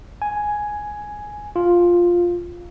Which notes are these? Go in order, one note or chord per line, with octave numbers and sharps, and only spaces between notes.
G#5
F4